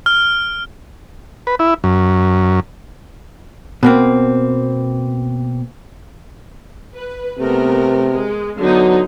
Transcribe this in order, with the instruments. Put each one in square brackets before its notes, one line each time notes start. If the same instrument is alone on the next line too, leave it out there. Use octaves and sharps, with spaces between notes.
[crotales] F6
[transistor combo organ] B4
E4
F#2
[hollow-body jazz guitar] B2 A#3 C4
[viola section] B4
[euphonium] C3 [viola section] A3 B3 A#4
[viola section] G#3
[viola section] D3 B3 D#4 [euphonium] F#3